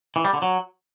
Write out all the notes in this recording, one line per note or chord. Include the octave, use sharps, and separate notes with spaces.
E3
G3
D3
F#3